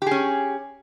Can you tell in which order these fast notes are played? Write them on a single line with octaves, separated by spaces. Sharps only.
G4 G#4 C#4